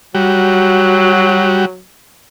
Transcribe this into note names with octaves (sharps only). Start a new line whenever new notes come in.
F#3 G3 F#4